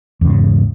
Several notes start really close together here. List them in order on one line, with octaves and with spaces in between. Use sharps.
E2 C#3 G#2